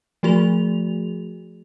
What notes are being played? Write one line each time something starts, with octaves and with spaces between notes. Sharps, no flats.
F3 A3 F#4 G#4 F7